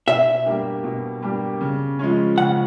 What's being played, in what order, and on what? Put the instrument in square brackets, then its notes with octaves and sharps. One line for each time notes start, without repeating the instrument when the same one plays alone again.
[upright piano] B2 [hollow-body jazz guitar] E5
[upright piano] G3 A#3 D4 G4
B2
G3 A#3 D4 G4
C#3
F3 G#3 C#4
[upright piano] C#3 [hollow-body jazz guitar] F#5